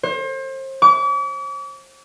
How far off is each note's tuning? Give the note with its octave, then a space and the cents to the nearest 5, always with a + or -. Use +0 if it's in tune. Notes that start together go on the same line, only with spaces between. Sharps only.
C5 +35
D6 -45